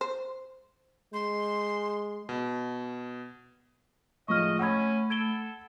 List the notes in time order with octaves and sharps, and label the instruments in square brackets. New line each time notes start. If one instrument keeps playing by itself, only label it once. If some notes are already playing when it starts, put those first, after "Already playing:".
[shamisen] C5
[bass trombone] G#3 [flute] C6
[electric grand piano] B2
[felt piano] A2 F3 G#3 [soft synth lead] A3 [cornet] D#5 [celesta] C#6 F6
[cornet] C#4 [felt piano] F#5 B5 [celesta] E6 G#6
[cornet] A4 [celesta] G#6 D7 G7